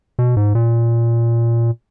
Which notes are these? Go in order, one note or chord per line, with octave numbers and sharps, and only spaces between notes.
B2
G#2
A#2